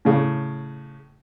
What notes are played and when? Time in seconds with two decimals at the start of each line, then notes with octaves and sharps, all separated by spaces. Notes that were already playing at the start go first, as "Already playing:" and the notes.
0.05 A2 C#3